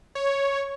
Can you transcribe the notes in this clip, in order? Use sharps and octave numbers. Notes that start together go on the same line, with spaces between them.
C#5